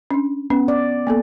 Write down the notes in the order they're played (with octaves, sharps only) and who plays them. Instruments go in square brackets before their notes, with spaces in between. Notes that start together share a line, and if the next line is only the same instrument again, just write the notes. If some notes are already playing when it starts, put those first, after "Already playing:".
[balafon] C#4 D4
[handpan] B3 [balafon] C#4
[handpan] D5
[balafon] A#3 B3 A4